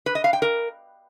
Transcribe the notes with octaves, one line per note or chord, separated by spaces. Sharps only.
B4
D#5
F5
G5
A#4